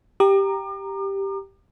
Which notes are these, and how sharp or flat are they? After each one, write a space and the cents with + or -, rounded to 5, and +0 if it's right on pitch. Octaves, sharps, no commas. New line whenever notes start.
G4 +0 A#5 +0 D6 +40